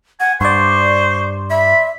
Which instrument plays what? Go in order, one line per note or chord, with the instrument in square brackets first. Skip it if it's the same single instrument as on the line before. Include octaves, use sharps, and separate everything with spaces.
[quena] F#5 [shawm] G#5
[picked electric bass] G2 [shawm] C5 [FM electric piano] D5 C6 [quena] C#6
[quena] E5 [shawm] B5